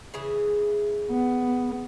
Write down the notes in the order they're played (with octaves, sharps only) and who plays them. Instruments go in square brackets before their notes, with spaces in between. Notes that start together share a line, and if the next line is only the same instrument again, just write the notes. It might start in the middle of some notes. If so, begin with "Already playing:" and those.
[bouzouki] C#3 E3 G#4
[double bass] B3